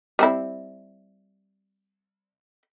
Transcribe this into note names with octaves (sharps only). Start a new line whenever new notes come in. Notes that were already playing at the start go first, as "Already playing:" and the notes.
G3 C4 E4